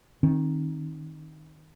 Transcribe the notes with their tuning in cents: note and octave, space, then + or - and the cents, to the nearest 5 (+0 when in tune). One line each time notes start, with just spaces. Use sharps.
D#3 +0 C4 +35